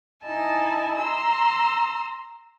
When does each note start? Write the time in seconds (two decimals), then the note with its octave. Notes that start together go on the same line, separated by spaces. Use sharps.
0.24 D#4 E4 G#5 A5
0.98 A#5 C6 E6